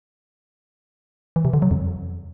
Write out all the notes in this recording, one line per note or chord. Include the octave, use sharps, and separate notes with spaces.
E3
C3
D3
F#3
F2